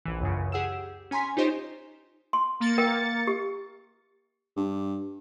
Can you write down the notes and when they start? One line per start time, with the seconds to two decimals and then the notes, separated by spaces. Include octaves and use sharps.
0.06 A#1 E3
0.21 C#2 F#2 C#3
0.52 G4 G#4 F#5 E6 E7
0.72 G4
1.11 C#4 G#5 A#5 C6 B6
1.37 D#4 F4 G4 C5 C#5 D#5
2.33 C6
2.60 A#3 A6 C#7
2.78 A#4 G5
3.27 G4
4.56 G2